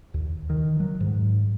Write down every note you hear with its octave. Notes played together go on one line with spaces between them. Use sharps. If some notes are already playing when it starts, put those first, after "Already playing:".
D#2
D#3
F#3
G#2